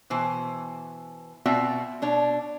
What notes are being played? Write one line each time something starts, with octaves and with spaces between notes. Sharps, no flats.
B2 E3 C5
B2 C4 F4 F#4 D5 E5
B2 D4 C#5